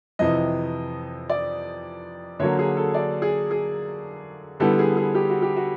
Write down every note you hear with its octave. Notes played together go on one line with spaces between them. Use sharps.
F2 C3 E3 D#5
D5
D3 F#3 A#3 C#5
G#4
A4
D5
G#4
G#4
D3 G3 B3 E4 A4
G#4
G#4
G4
F#4
G4
F#4